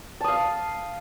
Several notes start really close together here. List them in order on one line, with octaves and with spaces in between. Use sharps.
A5 D#6 F5